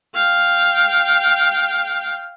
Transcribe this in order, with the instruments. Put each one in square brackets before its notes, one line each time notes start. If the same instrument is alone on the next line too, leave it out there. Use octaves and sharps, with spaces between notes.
[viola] F5 G5